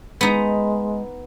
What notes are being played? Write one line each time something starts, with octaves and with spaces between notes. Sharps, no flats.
G#3 B3 D#4